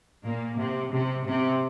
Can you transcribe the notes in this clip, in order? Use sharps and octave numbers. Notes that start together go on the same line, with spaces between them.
A#2 A#3
C3
C3
C3